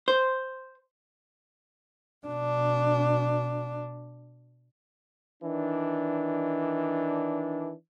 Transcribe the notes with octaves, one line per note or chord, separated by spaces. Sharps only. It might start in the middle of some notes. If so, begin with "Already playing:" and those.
C5
B2 D4
D#3 E3 D4